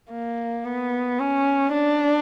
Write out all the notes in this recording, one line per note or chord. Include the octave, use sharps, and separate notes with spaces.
A#3
B3
C#4
D4